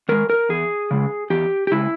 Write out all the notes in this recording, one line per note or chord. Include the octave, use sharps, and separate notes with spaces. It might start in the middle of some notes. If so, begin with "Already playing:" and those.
D#3 G#3 A#4
A#4
E2 G#4
C#3 G#3
E2 G4
G4
C#3 G#3 E4